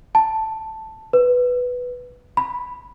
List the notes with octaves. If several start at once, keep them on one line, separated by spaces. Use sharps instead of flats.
A5
B4
B5